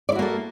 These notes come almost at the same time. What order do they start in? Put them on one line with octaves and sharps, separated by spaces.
D5 E4 F#4 A#3 A4